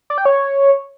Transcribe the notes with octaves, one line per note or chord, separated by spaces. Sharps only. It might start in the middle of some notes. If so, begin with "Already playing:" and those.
D5
G5
C#5